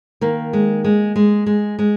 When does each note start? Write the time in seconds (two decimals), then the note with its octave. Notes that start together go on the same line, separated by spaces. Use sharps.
0.21 D#3 A#3
0.53 G#3
0.84 G#3
1.16 G#3
1.46 G#3
1.79 G#3